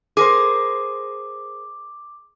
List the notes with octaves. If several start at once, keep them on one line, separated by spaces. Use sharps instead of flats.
G#4 A#4 C5 D6